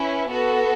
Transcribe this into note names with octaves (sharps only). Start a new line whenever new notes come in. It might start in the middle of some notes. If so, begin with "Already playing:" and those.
Already playing: C#4 E4 B4
B3 F#4 A4